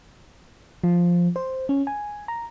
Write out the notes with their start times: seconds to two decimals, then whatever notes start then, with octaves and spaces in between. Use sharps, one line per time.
0.84 F3
1.36 C5
1.69 C#4
1.87 G#5
2.28 A#5